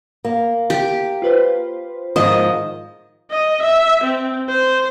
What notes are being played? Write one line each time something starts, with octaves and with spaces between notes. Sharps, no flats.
A#3
G4
F4 B4 C5
G#2 D#3 F3 D#5
D#5
E5
C4
C5